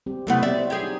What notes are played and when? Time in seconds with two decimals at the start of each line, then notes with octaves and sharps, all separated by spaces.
0.06 G3 C4 G4
0.27 C3 F#3 A3 B3 E4
0.43 G3 C4 D5 E5
0.70 G4 G#4
0.83 D#4